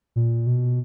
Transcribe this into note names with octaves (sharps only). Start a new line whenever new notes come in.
A#2
B2